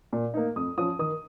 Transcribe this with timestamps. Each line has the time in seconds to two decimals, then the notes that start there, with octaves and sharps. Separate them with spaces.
0.13 A#2
0.34 A#3 D#4
0.56 F2 D#6
0.78 F3 C#4 D#6
0.99 D#3 D#6